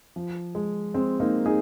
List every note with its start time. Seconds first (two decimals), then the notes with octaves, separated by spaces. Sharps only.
0.16 F3
0.55 G#3
0.94 G#3 C4
1.20 A#3 D#4
1.46 D#4 G#4